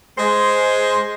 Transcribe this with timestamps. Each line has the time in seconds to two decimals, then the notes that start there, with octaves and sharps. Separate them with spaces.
0.18 G#3 C5